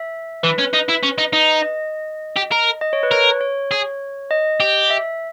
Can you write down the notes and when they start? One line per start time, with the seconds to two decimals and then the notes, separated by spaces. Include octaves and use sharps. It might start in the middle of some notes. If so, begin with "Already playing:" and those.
Already playing: E5
0.43 E3 B4
0.58 C#4
0.73 D#4
0.89 E4
1.03 C#4
1.18 D#4
1.33 D#4
1.63 D#5
2.37 G4
2.52 A#4
2.81 D#5
2.93 C#5
3.03 B4
3.11 A#4 C#5
3.41 C#5
3.71 G#4
4.31 D#5
4.60 G4
4.90 E5